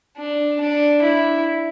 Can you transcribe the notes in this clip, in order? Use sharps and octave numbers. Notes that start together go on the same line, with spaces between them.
D4
D4
E4